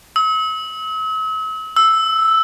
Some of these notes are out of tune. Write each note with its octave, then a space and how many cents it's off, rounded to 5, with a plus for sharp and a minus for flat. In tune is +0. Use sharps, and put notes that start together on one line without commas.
E6 -45
E6 +0